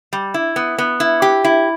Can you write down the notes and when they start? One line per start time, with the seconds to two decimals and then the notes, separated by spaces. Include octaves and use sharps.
0.13 G3
0.34 E4
0.56 B3
0.78 B3
1.00 E4
1.22 G4
1.44 E4